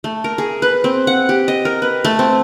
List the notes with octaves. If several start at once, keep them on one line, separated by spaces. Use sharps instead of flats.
A3
A#4
G#4
B4
C4
F#5
G4
D#5
A#4
B4
A3
C4